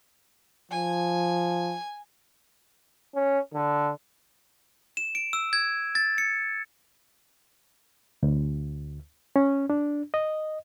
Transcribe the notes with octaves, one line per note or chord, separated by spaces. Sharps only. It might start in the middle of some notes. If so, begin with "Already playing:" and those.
F3 G#5
C#4
D3
E7
D7
E6
G#6
A6
C#7
D2
C#4
D4
D#5